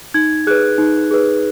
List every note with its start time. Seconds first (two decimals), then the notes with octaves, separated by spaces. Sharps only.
0.14 D#4 G#6
0.47 G#4 B4 F#6
0.78 D#4
1.11 G#4 B4